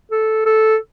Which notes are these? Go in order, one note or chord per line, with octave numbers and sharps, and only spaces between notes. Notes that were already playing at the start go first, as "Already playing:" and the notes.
A4
A4